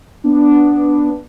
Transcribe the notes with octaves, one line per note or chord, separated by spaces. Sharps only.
B3 D4